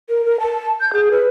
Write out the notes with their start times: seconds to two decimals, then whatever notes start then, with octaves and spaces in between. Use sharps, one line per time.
0.10 A#4
0.25 A#4
0.40 A5
0.81 G6
0.93 G#4
1.11 B4